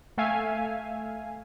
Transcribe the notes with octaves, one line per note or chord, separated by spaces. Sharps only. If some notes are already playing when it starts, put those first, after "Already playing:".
A3 E5 F5 G#5